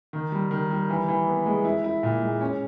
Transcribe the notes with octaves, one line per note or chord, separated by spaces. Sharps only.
D#3
G3
D#3
G3
E3
E3
B3
G#3
E4
E4
A#2
G#3
C#4